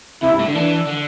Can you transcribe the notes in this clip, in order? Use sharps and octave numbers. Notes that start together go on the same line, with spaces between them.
C3 E4
G2
A2
D3
E3 D4
D3